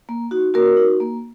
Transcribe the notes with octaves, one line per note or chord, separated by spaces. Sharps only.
A#3
D#4 F#4
A#3 F#4 A#4
D#4 F#4
A#3